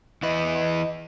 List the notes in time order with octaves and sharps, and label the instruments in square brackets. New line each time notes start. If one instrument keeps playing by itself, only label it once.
[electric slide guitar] E2 E4 B4 [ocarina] D#5